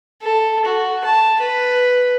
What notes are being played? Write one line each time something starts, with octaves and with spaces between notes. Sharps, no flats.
A4
F#4
A5
B4